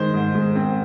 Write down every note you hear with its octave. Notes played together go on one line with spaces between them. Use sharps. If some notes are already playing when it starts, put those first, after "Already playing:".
Already playing: D#3 G#3 C5
G#2
G#3
C4